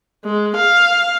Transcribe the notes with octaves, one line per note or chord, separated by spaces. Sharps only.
G#3
F5